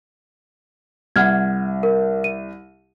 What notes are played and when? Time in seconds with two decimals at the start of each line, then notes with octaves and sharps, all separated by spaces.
1.16 C2 F#5 F6 G#6
1.83 A#4
2.24 D#7